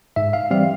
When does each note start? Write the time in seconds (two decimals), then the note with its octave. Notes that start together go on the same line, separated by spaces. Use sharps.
0.16 G#2 E5
0.33 F5
0.51 E3 G3 C4 F5